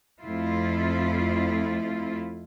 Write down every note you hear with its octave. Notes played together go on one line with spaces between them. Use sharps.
F2 A3 E4 F4